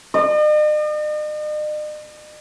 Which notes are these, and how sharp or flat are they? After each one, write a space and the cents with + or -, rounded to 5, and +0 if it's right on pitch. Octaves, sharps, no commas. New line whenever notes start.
D#5 -45